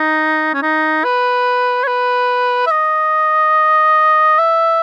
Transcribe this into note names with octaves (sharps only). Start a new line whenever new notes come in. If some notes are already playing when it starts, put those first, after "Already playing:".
Already playing: D#4
C#4
D#4
B4
C#5
B4
E5
D#5
E5